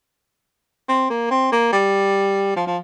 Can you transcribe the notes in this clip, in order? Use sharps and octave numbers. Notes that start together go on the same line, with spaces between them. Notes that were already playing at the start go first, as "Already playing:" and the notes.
C4
A#3
C4
A#3
G3
F3
F3